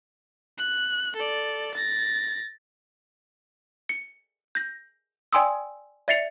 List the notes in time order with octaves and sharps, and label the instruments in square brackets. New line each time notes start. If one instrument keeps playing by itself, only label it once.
[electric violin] F#6
A4 D5
A6 A#6
[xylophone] C#7
G6 A#6
D5 G5 G#5 C6 D#6 E6
D5 E5 A6 C7 C#7 F7